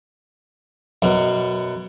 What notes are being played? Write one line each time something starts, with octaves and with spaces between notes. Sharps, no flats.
F#2 B2